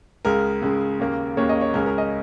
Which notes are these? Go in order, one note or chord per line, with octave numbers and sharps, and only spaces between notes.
C#2 C#3 G#3 A#4
C#2 C#3 G#3
D#2 C#3 A#3
D#2 C#3 A#3 C#5
D#5
C#5
C#2 C#3 G#3 C#4 A#4
A#4
D#5